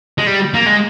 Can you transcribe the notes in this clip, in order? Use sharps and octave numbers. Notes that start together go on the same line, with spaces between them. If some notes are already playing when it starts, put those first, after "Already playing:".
G#3
G3
A#3
G#3